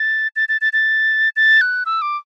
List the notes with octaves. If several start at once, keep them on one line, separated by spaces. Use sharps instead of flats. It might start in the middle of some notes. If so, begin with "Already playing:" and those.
Already playing: A6
A6
A6
A6
A6
A6
F#6
E6
D6